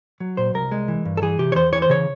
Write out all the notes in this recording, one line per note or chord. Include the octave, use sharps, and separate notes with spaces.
F#3
A#2 C5
C2 A#4
G#3
E3
G2
A4
E3 G#4
C3 G4
C#5
E2 C5
E3 C#5
C5
C#3 C#5